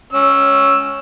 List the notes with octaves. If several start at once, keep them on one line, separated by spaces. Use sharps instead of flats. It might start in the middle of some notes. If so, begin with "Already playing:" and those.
C#4 E6